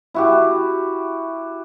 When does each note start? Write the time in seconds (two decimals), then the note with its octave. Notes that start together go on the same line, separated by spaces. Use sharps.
0.14 E4 F#4 G4